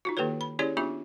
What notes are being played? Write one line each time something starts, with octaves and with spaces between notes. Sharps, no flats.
D#4 F4 F#4
D#3 A#3 G4 A4 B4 C#5
B5
C#4 E4 G4 G#4 C#5 D5
B3 D4 F4 G4 E5 D6